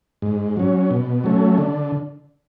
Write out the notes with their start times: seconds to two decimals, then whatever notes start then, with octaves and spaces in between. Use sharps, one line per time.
0.22 G#2
0.57 F#3 C#4
0.91 B2
1.24 F#3 A3 C#4
1.58 D3